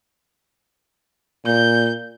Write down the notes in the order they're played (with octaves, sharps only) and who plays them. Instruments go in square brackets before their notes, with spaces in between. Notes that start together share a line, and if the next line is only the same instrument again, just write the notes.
[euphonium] A#2 [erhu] G6